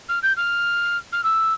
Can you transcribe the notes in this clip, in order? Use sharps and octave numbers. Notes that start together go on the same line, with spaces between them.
F6
G6
F6
F6
E6